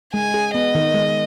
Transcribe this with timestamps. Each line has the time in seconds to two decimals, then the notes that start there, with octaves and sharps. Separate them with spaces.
0.14 G#3 G#5
0.34 G#4
0.54 B3 D#5
0.75 D#3
0.94 G#3